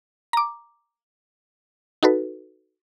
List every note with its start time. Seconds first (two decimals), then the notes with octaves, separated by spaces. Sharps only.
0.33 A#5 D6
2.03 D#4 F#4 A4 B4